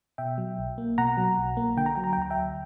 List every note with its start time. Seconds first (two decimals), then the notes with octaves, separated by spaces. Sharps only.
0.18 B2 E5 G5
0.38 F#3
0.58 B1
0.78 A#3
0.98 B2 F#5 A#5
1.17 F#3
1.38 B1
1.57 A#3
1.77 D3 G5
1.86 A#5
1.95 F#3 G5
2.04 A#5
2.13 G5
2.17 D2 A#5
2.30 E5 G5
2.37 D2